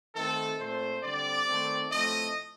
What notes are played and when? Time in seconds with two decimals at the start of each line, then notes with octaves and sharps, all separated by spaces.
0.15 D#3 A3 C4 A4
0.59 A#2 A3 C4 C5
1.03 D3 G3 C4 D5
1.47 D#3 A3 C4
1.91 A2 F3 A3 C4 D#5